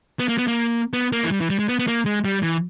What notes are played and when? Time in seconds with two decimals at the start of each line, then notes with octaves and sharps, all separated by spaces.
0.19 B3
0.29 A#3
0.38 B3
0.47 A#3
0.93 B3
1.12 A#3
1.23 E3
1.31 G3
1.41 E3
1.50 G3
1.59 G#3
1.69 B3
1.79 B3
1.87 A#3
2.05 G#3
2.25 G3
2.43 E3